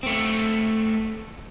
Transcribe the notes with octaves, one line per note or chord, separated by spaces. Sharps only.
A3 C4